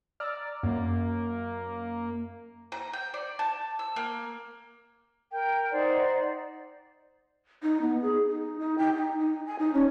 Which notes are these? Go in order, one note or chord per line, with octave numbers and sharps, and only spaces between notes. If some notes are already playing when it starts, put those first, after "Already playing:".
D5 A#5 E6 F6
F#2 A#3
A#5
G5
D5
A5
E6
A#3
A#4 G5
D#4 C5 D5 F#5
D#4
B3
G#4
D#4
D#4
G5
D#4
D#4
G#5
D#4
C#4